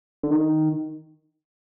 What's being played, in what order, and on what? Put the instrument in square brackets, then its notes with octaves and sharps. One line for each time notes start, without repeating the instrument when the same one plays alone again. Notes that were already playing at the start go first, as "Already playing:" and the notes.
[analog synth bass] D3
D#3